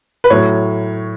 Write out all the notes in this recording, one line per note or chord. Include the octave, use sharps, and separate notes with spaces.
B4
A2 F#3 C#5